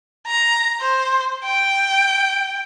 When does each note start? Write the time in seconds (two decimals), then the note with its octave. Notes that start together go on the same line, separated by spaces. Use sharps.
0.27 A#5
0.80 C5
1.45 G5